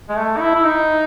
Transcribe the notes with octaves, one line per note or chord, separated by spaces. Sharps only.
G#3
A3
D#4
E4
E4
D#4